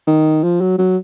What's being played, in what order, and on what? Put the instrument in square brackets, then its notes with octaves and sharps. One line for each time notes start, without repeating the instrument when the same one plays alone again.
[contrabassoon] D#3
F3
F#3
F#3